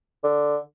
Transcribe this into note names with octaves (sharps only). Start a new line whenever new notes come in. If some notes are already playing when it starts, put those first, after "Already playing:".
D3